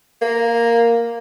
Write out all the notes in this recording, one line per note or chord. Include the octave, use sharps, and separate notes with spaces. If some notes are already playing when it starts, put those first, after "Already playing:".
A#3